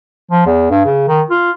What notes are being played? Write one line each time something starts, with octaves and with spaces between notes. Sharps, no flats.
F3
E2
G2
C#3
D#3
F4